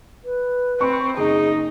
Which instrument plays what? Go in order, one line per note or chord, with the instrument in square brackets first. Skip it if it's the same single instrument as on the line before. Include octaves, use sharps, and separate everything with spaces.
[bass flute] B4
[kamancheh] C4 [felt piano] B5 C#6
[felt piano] F#1 [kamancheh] D#4 [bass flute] G#4